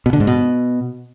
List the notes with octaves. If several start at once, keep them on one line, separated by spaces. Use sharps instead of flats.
B2
D3
G#2
B2